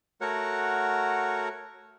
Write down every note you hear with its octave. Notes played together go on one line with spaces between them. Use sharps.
A3 F#4 A#4 C#5 F#5